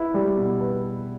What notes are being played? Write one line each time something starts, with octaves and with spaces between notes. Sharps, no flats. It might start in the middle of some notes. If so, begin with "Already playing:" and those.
Already playing: E4 B4
G3
B2
B4